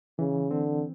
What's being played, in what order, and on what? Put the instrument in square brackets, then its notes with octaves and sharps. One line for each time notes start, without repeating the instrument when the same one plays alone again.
[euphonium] C#3 [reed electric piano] E3
[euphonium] D3 [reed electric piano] C4